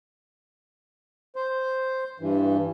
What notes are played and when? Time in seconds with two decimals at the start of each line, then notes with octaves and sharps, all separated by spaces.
1.36 C5
2.20 G2 E3